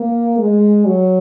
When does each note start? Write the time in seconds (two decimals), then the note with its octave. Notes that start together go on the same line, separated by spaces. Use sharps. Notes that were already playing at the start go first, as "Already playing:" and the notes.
Already playing: A#3
0.38 G#3
0.86 F#3